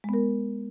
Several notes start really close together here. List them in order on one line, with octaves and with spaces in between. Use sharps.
G#3 B3 A#4